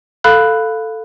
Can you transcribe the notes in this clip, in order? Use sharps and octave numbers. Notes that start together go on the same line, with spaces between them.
A4 F5 B5 F#6